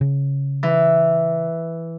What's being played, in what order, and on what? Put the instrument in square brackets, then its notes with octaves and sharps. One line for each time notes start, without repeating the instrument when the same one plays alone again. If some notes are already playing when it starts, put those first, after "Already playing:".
[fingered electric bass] C#3
[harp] E3